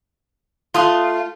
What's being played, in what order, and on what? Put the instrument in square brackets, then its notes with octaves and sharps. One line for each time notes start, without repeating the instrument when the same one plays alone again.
[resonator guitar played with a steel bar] A3 F4 [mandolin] C6 D#6 F#6